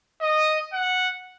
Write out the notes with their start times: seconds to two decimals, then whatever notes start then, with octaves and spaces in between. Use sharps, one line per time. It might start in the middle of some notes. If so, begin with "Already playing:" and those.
0.21 D#5
0.73 F#5